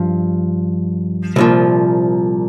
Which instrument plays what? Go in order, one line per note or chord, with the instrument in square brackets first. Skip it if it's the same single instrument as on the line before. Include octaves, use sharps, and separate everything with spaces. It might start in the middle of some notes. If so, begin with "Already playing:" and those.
Already playing: [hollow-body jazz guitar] G2 F3
C2 A#2 F3